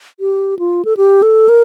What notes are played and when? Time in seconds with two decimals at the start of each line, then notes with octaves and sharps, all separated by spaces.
0.20 G4
0.59 F4
0.85 A4
0.97 G4
1.22 A4
1.49 A#4